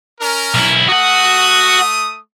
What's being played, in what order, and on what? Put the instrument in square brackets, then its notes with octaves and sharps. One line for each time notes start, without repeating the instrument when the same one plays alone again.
[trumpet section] C#4 A#4
[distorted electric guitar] B1 E4
[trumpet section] A3 D#6 [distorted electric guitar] F#4 F#5